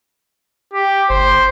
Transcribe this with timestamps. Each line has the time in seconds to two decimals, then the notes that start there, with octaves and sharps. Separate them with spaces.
0.74 G4
1.10 G1 C5